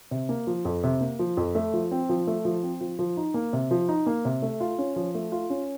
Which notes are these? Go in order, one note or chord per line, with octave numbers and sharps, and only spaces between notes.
C3
A#3
F3
F2
C3
A#3
F3
F2
A3
F3
C4
F3
A3
F3
C4
F3
F3
D#4
A#3
C3
F3
D#4
A#3
C3
A3
F4
C#4
F3
A3
F4
C#4